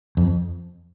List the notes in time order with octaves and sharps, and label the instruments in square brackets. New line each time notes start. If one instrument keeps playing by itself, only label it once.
[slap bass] F2